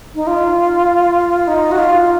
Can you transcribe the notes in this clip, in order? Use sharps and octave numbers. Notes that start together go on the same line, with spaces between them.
D#4
F4
D#4
F#4
F4